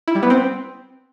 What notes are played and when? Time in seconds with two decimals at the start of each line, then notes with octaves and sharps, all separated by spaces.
0.08 E4
0.15 G3
0.23 B3
0.30 C4